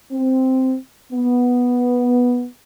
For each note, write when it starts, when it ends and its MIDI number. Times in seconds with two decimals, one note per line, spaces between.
0.12 0.76 60
1.12 2.46 59